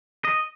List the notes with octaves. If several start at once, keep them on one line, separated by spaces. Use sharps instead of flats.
D#5